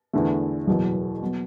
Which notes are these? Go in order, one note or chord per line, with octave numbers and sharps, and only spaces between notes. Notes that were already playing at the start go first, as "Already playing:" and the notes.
E2 D3 A3
F#1 E2 B2 F#3
F#3 B3